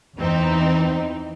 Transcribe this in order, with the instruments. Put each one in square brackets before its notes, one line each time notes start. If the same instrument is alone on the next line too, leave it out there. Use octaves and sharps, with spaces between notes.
[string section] E2 E3 C4 D#4